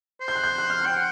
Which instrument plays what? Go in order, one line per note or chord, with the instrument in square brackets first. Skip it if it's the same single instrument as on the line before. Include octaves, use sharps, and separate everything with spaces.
[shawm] C5
[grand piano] G6
F#6
G6
F#6
F6
F#6
[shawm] G5
F#5